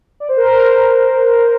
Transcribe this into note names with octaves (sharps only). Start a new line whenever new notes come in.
D5
C5
A#4
C5